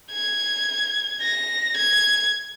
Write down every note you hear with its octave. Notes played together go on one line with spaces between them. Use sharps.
G#6
A#6
G#6